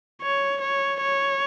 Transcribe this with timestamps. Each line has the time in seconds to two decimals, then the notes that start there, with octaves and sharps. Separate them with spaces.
0.22 C#5
0.62 C#5
1.02 C#5